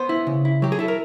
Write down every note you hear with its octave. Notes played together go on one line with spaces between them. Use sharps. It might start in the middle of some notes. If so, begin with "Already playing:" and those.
Already playing: B3 C5
E4
C#3
E4
F#3 G4
G#4
E4 A4
A#4